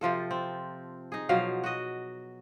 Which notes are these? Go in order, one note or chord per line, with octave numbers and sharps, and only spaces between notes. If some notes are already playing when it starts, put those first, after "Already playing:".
C3 F3 F4 A4
C4
D#4 G#4
B2 F3 F#3 F5
F#4 D#5